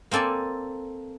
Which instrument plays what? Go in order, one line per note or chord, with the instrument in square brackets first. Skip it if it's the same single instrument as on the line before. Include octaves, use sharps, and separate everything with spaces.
[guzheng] A#3 C4 A4 D5 G#5